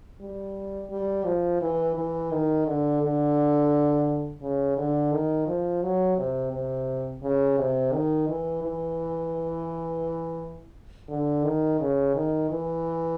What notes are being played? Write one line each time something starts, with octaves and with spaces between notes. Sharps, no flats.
G3
G3
F3
E3
E3
D#3
D3
D3
C#3
D3
D#3
F3
F#3
C3
C3
C#3
C3
D#3
E3
E3
D3
D#3
C#3
D#3
E3